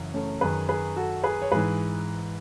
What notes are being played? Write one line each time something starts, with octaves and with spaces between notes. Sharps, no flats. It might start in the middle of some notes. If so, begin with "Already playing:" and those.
Already playing: F#2 C#3 E3
A3 C#4
F#2 D#3 G#4 B4
G#4 B4
F#4 A4
G#4 B4
C#5
G#2 E3 G#4 B4